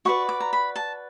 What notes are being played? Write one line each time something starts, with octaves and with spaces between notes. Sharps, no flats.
F#4 B4 D5 C#6
D6
A#5
B5
A5